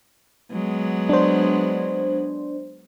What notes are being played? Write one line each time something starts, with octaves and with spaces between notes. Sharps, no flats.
F#3 G#3 B3
D4 C5